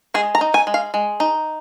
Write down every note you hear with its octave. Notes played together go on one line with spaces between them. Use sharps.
G#3 G#4
A#5
D#4
G#5
G#3
F5
G#3
D#4